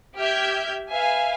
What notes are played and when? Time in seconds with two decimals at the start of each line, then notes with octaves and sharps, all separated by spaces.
0.18 G4 E5 F6 G6 G#6
0.91 B4 E5 F5 G#5